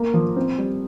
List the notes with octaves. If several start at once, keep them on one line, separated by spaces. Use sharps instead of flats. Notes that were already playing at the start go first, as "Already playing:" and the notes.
Already playing: A#3
F3
C4
G3